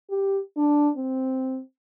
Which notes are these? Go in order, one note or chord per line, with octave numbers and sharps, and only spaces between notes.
G4
D4
C4